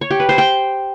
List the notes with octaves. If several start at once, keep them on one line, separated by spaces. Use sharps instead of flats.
C#5
G4
B4
C5
G5